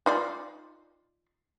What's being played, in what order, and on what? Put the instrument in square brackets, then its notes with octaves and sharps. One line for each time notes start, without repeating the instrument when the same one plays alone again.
[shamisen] D#4 F4 D5